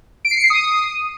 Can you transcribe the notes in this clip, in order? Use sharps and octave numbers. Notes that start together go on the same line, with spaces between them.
D7
C7
C#7
C7
D#6